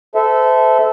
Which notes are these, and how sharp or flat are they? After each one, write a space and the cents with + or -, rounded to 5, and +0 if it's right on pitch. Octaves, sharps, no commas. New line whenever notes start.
A4 -10 C5 -35 E5 -15